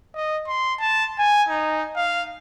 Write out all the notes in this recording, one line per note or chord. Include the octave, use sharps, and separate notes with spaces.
D#5
C6
A5
G#5
D#4
F5